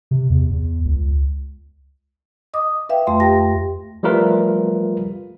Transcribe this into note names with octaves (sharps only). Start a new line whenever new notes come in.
C3
E2
E2
C#2
D#5 D6 D#6
B4 E5 F5 G5
F2 A3 E5 C6
G4 G5 A#6
F3 G3 A3 F4 A#4 B4